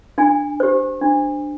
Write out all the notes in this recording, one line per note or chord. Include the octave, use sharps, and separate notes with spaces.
D4 G#5
G4 C5
D4